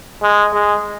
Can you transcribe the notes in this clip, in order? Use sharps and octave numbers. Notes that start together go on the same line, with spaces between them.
G#3
G#3